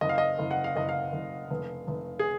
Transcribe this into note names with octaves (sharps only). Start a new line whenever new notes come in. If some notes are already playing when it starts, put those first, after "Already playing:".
F#1 D#5
F5
D#5
F#1
F#5
F5
F#1 D#5
F5
F#1
F1
F1
G#4